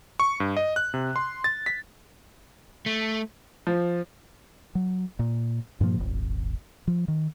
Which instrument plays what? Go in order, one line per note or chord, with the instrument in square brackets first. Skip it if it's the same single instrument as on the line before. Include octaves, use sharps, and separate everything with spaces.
[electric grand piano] C#6
G2
D#5
F#6
C3
C6
A6
B6
[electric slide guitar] A3
[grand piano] F3
[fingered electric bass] F#3
A#2
G2 A#2 F3 A#3
D#1 G#1
F3
D#3